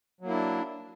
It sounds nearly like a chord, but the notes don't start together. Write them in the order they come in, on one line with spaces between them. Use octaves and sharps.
F#3 A#3 E4 D4